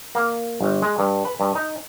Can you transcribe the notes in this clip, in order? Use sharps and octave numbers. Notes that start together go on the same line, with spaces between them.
A#3
G1
G#3
G2
B4
G2
D#4